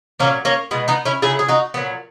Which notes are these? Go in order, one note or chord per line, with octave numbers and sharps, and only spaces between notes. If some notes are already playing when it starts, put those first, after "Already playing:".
A#2 F#3 A#3 C#4
A#3 C#4
B2 G#3 B3
B3 D#4
C#4 E4
C#3 F#3 E4 G#4
G#4
D#4 F#4
A#2 F#3 B3